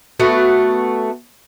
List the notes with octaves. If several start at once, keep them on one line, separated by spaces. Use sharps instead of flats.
A3 B3 F#4